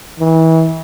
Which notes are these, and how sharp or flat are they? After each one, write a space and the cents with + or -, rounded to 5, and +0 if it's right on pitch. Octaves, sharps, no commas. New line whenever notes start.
E3 -30